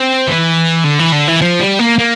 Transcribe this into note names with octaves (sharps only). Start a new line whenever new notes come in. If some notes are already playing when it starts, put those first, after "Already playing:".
Already playing: C4
E3
D3
E3
D3
E3
F3
G3
A#3
A#3